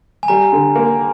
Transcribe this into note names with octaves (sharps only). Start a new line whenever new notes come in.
G#5
G3 A#5
D3
A#3